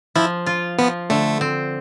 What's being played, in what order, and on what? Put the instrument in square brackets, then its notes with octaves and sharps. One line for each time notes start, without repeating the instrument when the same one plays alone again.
[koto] F3 [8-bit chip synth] E4
[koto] F4
[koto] F3 [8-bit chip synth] B3
[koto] D3 [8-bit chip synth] A3
[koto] C4